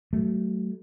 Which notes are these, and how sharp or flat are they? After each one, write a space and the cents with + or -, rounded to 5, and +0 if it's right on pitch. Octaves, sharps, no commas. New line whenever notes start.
F#3 +30 A3 +0